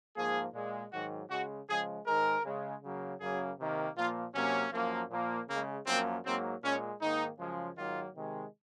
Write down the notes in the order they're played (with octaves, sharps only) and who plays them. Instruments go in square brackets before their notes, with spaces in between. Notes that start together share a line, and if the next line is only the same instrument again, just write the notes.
[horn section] G#2 F3 A#3 G#4
A#2 G#3
G#2 D#3 F#3 F#4
C#3 G#3 F#4
C#3 F3 G#3 G#4
G#2 D#3 G#3 A#4
C#3 G#3
C#3 F#3 A#3
F#2 C#3 F#3 A#3 G#4
C3 D#3 A#3
A#2 F3 A#3 F4
C3 F#3 A#3 C#4
F#2 F3 A#3
A#2 F3 A#3
C#3 G#3 A#3
F#2 F3 A#3 C4
G#2 F#3 A#3 C4
A#2 G#3 C#4
G#2 D#3 A#3 D#4
F#2 C#3 F3 G#3
G#2 D#3 F#3 A#3 F4
C3 D#3 G#3